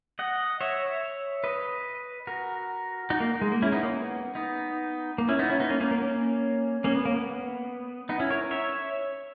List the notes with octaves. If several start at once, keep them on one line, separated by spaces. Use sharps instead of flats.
D#5 F#5
C#5 E5
B4 D#5
F#4 A#4
D#4 F#4
A#3
G#3
A#3
C#4 E4
B3 D#4
A#3
B3
B3 D#4
A#3
C#4 E4
B3 D#4
C#4 E4
B3 D#4
A#3 C#4
A#3 C#4
A#3
A#3 C#4
A#3 C#4
B3
A#3
B3
B3 D#4
C#4 E4
A#4 C#5
C#5 E5